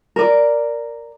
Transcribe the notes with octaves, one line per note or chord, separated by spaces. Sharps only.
A#4 D5